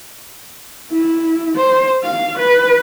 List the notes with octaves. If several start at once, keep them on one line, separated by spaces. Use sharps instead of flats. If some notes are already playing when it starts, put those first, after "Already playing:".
E4
C5
F5
B4